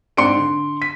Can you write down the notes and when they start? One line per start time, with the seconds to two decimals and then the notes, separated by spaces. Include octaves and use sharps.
0.17 G#2 C4 D4 C6 C#7 D7
0.37 D3
0.82 B6